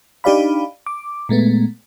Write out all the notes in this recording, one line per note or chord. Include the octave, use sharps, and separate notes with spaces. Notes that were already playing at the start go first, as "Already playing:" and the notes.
D4 D#4 G4 D5 F5 B5
D6
A#2 G#3 A3 B3